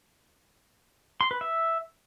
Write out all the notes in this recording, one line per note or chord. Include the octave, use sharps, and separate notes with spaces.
C6
B4
E5